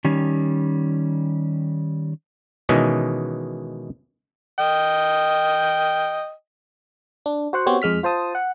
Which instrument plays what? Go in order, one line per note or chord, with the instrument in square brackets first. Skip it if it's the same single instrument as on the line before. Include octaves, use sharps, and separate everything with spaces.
[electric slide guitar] D#3 G3 C#4
[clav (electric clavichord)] B2 D#3 E3 G#3 C#4
[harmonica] D#5 G5
[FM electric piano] D4
F#4 C5 F#5
B3 C4 F#4 G4 C5 C#5
F2 G#3 F6 B6
F4 C5 A5 D#6
F#5